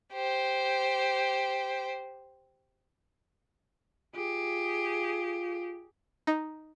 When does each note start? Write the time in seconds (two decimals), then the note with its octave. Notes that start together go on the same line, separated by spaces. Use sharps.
0.13 G4 C5
4.16 F4 G4 G#4
6.27 D#4